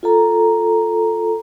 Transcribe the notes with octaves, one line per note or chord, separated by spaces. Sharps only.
F4 A4 A#5